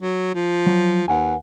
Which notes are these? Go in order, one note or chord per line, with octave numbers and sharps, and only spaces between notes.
F#3
F3
F#3
D#2 B4 F#5 G#5